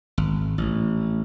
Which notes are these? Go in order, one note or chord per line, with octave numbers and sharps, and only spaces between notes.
G#1
A1